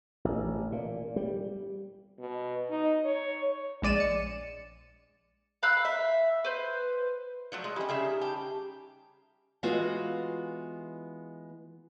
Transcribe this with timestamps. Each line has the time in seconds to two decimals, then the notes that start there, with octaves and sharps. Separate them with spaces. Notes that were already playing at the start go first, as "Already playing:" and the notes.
0.25 A1
0.72 A#2
1.16 G3
2.19 B2
2.70 D#4
3.05 C#5
3.82 A#1 G#3 D5 D#7 E7
4.00 C#7
5.63 F5 B5 E6 F#6
5.85 E5
6.44 B4 C5
7.52 F3 F#3 A3
7.64 G#3
7.76 G3 C#4 E4 D#5
7.89 C#3 G#4 E5
8.02 D#4
8.21 G4 A5 D6
9.63 E3 G#3 B3 F4 F#4